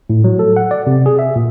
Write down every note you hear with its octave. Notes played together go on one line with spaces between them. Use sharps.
A2
F#3
A4
F#5
D5
C3
G#4
E5
A#2